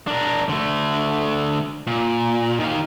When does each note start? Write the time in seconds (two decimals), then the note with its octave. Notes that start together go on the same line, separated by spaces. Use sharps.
0.07 D4 A#4
0.49 D3 A3
1.87 A#2
2.60 D#3 F5